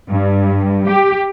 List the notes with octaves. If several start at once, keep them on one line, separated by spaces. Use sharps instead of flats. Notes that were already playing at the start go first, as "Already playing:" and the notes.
G2
G4